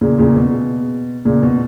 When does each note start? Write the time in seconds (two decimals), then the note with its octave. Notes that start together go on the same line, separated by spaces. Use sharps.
0.01 A#2 C#3
0.18 A#2 C#3
0.36 B2
1.25 A#2 C#3
1.43 B2